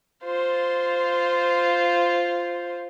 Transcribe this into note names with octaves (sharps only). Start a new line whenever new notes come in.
F4 C5